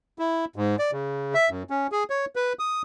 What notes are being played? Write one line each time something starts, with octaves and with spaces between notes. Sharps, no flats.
E4
G#2
D5
C#3
E5
F#2
C#4
G#4
C#5
B4
D#6